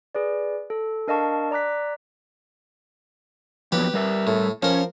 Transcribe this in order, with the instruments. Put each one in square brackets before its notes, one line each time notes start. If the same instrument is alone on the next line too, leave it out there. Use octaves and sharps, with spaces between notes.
[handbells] G#4 B4 D5
A4
D4 A#4 D#5 F5 A5 C#6
D5 A#5 D6 F#6 B6
[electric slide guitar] F3 F#3 B3 [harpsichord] G4 B4
[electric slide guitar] G3 A#4 E5
[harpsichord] A2
[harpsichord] F3 A#4 [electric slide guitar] C#4 C#5